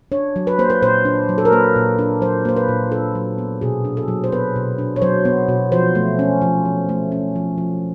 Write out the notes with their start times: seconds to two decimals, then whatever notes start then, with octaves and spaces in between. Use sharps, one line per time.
0.12 D4 C#5
0.36 F#3
0.47 B4
0.59 A#3 C5
0.70 B4
0.82 A#2 C5
1.05 D4
1.29 F#3
1.38 A4
1.45 A#4
1.52 A#3 B4
1.76 A#2
1.99 D4
2.21 F#3 C5
2.45 A#3 C5
2.56 B4
2.68 A#2
2.91 D4 A4
3.15 F#3
3.38 B3
3.61 B2 G#4
3.85 D4
3.97 A4
4.08 F#3
4.24 C5
4.32 B3 B4
4.56 B2
4.78 D4
4.96 C#5
5.02 F#3 C5
5.25 B3
5.48 B2
5.72 F3 C5
5.95 A3
6.19 C#4
6.42 F3
6.65 F3
6.89 A3
7.12 C#4
7.35 F3
7.58 F3